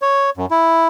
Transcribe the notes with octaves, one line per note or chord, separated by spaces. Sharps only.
C#5
F#2
E4